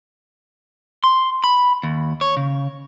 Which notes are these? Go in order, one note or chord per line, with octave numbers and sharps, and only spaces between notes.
C6
B5
D#2
C#5
C#3